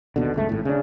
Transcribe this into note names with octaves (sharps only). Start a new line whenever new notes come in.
D#2 B2 D3
G1 C#2 A3
G#1 A2
C#3 D4